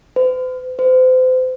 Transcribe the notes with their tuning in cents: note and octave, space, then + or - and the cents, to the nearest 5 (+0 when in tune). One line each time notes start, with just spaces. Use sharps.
C5 -45
C5 -35